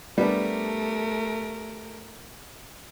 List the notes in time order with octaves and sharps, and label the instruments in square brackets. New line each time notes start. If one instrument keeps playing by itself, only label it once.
[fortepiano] G3 B3 D4 [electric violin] A3 A#4